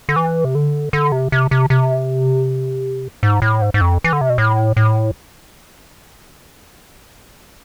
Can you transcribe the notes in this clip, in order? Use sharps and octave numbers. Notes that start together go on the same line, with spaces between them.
D3
E3
C3
D3
D3
C3
C3
C3
C3
G#2
A2
G#2
G#2
F2
E3
D3
C3
B2
A2
A2